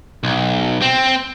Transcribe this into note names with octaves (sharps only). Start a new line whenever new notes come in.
B1
C4